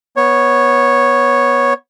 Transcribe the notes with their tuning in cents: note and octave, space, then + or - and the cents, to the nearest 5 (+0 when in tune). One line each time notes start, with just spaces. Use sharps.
B3 -10 C#5 -5